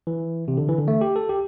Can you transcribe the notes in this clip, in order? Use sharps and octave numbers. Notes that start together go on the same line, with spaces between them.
E3
C3
D3
E3
D3
A3
G4
A4
G4